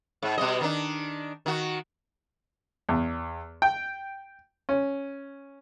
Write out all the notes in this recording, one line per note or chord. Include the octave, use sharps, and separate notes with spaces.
G#2
B2 G3 D#5
D#3 D4
D#3 F#4
E2
G5
C#4